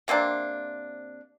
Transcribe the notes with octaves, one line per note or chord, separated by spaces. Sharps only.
C3 A#3 C4 D4